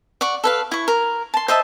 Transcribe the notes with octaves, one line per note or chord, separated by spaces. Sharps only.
D5 F#5 C#6
A4 B4 F5
E4 C#6
A#4
A5 C6
C5 D#5 E5 A5